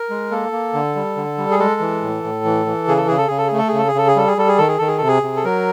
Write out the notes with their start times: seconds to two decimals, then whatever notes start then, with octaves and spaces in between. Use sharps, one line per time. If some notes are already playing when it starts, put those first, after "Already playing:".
Already playing: A#4
0.10 G#3
0.31 A#3 A4
0.52 A#3
0.74 D3
0.95 G3
1.16 D3
1.38 G3
1.51 G#4
1.59 G#3 A4
1.80 E3
2.02 A2
2.23 A2
2.45 E3
2.66 E3
2.88 C#3 G#4
2.97 A4
3.08 C#3 G#4
3.18 A4
3.28 C#3 G#4
3.38 A4
3.48 A3 G#4
3.58 A4
3.68 G#4
3.73 C#3 A4
3.88 G#4
3.95 C#3 A4
4.08 G#4
4.16 G3 A4
4.28 G#4
4.37 G3 A4
4.48 G#4
4.58 D#3 A4
4.68 G#4
4.78 D#3 A4
4.87 G#4
4.98 C3 A4
5.08 G#4
5.23 C3
5.36 A4
5.44 F#3 A#4